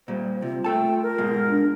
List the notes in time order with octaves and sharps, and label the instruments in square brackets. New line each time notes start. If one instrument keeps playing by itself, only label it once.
[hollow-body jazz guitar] A#2 G3 [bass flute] C5
[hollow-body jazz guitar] C3 [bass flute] F4
[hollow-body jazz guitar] A3 A4 A5 [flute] G5
[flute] A#4
[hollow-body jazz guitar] G#2 B2 G#3
[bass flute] D4